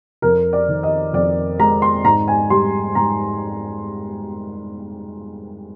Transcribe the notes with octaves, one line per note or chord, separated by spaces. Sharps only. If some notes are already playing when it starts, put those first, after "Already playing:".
F2 A#4
D5
D#3
D#5
F2 D5
G#3 A#5
C6
G#2 A#5
G#5
G3 C6
G#2 A#5